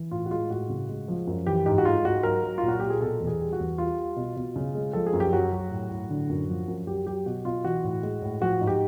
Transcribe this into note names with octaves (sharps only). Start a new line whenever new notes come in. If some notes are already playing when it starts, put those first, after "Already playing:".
Already playing: E3
A2 F4
F#4
G#3 F4
A2 F#4
C#3
G#3
F3
F#2
E3 G4
G#2 G4
F#4
G#3 F4
G#2 F#4
F#3 A#4
F#3
A#2 F4
F#4
A#2 G4
G#4
B2 A4
E2
G#4
G3
F#4
E2
G3 F4
G3
B2
B2
C#3
G#3
F3 A4
G#4
F#2
G4
F#3 F#4
F#3
A2
A2
D3
F#2
F3
F#2
F#3 G4
F#3 G4
B2 F#4
B2 F4
E3 F#4
A2
G#3
A2
F3 F#4
G#2
G4